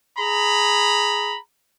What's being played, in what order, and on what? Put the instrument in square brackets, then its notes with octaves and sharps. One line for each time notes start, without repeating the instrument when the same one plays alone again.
[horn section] G#4 A#5 B5